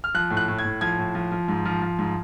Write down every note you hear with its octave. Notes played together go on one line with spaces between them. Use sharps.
F6
F3 F#6
A2
F#6
A2
G#6
A2
F3 G#6
A2
F3
F3
G#2
F3
F3
G#2